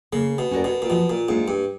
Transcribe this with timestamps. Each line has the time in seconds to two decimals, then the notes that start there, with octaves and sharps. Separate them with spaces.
0.13 C#3 A#3
0.38 B2
0.51 C#4 F#4 A#4 D5
0.64 B2
0.82 A#2
0.90 B2 F3
1.10 A#2
1.29 G#2 A#3 D4 F4
1.48 G2